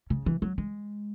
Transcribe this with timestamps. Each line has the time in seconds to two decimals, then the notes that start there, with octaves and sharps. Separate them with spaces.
0.10 C#3
0.26 E3
0.42 F#3
0.58 G#3